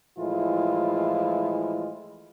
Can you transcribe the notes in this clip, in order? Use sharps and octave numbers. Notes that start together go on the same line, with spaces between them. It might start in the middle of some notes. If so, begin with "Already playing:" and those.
A2 E3 F3 G#3 E4 F4